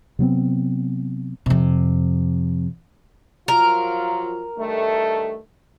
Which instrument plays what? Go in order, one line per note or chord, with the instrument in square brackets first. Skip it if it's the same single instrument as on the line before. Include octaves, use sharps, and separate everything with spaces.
[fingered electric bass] C3 F#3 B3 C4
[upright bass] F2 C3
[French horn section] F3 F#3 F4 [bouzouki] A#4
[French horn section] G2 D#3 A3